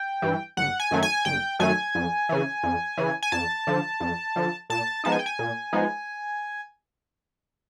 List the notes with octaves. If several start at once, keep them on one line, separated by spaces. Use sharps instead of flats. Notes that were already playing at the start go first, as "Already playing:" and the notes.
Already playing: G5
G2 E3
G1 F#5
G#5
F#2 D#3 F#3 A3
G#5
G1 G5
F#2 D#3 F#3 A3 G#5
F2
C#3 E3
F2
C#3 E3
G#5
F2 A5
D3 F3
F2
D3 F3
A#2 A5
F3 G#3 B3 D#4 A5
G#5
G5
G#5
A#2
F3 G#3 B3 D#4